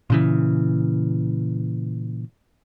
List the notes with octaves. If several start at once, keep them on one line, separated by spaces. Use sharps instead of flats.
A#2 C#3 E3